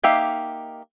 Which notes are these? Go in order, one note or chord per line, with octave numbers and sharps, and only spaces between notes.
A#3 D#4 G4 E5 F5